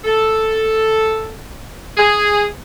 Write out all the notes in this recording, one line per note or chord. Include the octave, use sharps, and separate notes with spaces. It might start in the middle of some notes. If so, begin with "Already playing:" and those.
A4
G#4